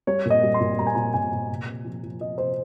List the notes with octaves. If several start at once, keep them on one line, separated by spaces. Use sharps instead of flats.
G3 C#5
A#2
D#5
G3
C6
A#2
G3 A#5
G#5
A#2 A#5
A#2 G#5
A#2
C3
C3
F3
F3
F3 D#5
C3 C5